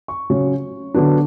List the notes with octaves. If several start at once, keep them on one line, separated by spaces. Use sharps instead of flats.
C#6
C#3 F#3 C#4
D3 F#3 B3 D4